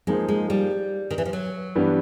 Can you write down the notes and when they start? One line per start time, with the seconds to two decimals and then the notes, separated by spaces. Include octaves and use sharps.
0.07 F3 G#3 A#3 D#4 G#4 C5
0.28 G#3
0.50 G3
1.11 D#3
1.18 E3
1.25 F3
1.33 F#3
1.75 G2 E3 G3 B3